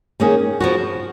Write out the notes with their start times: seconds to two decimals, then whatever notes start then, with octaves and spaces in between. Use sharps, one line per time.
0.20 D#3 A#3 C#4 G#4
0.60 F3 B3 F#4